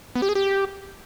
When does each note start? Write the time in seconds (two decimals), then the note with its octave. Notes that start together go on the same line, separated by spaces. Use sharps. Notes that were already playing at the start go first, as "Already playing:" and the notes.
0.16 B3
0.22 G4
0.29 G#4
0.35 G4